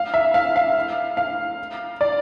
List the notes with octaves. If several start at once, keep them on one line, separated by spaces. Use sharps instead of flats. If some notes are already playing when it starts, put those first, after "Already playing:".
Already playing: F5
E5
F5
F5
F5
D5